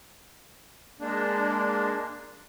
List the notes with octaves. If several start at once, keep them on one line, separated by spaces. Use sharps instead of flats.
G#3 A#3 D4